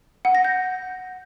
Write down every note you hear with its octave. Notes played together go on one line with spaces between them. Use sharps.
F#5
A#6
G6